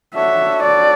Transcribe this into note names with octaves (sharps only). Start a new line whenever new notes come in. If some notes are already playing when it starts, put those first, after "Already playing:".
D4 F#4 A4 C#5 E5 F#5
D5